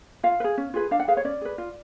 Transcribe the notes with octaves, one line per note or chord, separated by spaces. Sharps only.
F4 F5
B4
G#4
C#4
F4 G#4 B4
D4 F5
F#5
G#4 B4 F5
C#5
C#4 D5
G#4 B4
F4